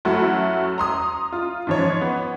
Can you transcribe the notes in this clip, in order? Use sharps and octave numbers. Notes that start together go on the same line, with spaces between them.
F#2 A3 E4 F#4
A#5 C6 D#6
F4
G#2 F3 C#5
B3